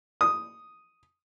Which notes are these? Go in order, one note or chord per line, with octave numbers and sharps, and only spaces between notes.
D#6